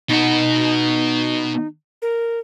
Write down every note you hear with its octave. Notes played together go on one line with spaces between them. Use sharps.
B2 D#4 F#5
A#4